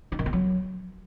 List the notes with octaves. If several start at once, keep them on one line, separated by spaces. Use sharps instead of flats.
D#4
D#3
B3
F#3